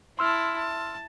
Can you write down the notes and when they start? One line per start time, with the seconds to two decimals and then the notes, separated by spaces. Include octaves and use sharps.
0.19 E4 A5 C6 E6 F6
0.57 A5